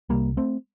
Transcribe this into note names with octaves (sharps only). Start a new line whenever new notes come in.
C2 C3 G3 A#3
A3 C4